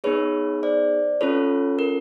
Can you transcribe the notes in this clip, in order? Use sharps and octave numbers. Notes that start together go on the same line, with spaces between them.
B3 D#4 G#4 B4 C#5
C5 D5
C#4 F4 A4 B4 C#5
A#4